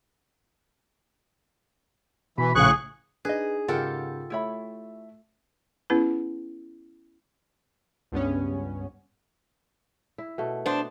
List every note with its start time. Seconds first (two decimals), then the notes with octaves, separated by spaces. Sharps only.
2.38 B2 E3 B5
2.55 A#1 A2 C#3 G#4 F5 C#6 F#6
3.25 D4 D#4 G#4 B4 D#5
3.68 G#2 C#3 F4 G4 A4 A#4 F#5 G5
4.30 A3 E4 C#5 E5 B5
5.90 B3 C#4 E4 G#4 B4
8.12 C#2 G2 B3 C#4
10.18 E4
10.38 B2 A3
10.66 B3 D4 C5